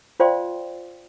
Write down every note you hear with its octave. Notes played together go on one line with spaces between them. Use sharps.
F4 C5 D5 F5 G5 C6